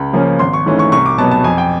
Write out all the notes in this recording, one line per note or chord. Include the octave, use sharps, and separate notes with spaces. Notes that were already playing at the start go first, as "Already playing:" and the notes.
Already playing: C#2 B5
C#3 F3 A#3 C#4
G#1 C6
C#6
G#2 E3 A3 C#4
C#6
C2 C#6
D6
B2 F#3 B3 A5
A5
F2 G#5
G5